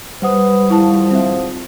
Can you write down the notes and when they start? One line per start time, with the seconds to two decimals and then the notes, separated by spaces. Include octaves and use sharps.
0.22 G3 B4 C5 F#5 D#6
0.70 G#1 F3 E4 A5
1.11 C4 E5